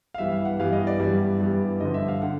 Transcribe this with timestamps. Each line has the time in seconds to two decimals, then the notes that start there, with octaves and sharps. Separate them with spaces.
0.14 F5
0.18 G2 E3 G3 B3 E5
0.32 F5
0.45 F#5
0.59 G2 E3 G3 B3 F5
0.72 D#5
0.87 D5
1.00 G2 E3 G3 B3
1.41 G2 E3 G3 B3
1.80 G2 D3 F3 D#5
1.94 E5
2.08 F5
2.22 D3 F#5